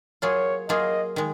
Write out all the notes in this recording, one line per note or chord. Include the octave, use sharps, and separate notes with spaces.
F#3 A#3 F4 G#4 C#5
F#3 A#3 F4 G#4 D#5
D#3 G#3